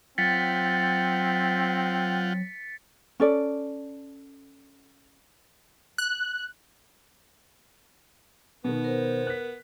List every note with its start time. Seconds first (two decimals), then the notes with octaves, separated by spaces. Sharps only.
0.18 F#3 C4 F4 F#5 G5 A6 B6 C#7
3.20 C#4 A4 D5
5.98 F#6
8.64 B2 D#3 B3
8.84 A#4 C5
9.27 F#6 B6